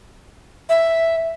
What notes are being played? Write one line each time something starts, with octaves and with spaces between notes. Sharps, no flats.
E5